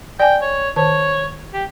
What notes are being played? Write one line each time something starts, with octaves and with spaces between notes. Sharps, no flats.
D5 G5 G#5
C#5
D#3 C5 C#5 A5
G4